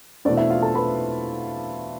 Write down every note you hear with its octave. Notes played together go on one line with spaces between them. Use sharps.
E2 B2 A3 C4 D4 D5
E4 E5
F4 F5
A4 A5
B4 B5